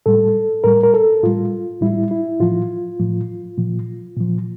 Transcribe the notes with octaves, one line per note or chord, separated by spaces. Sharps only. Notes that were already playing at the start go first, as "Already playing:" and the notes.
A2 G3 A4
A2 G3 A#4
A#4
A4
A2 G3 F4
A2 G3 E4
E4
A2 F3 F4
A2 F3
A#2 F3
A#2 F3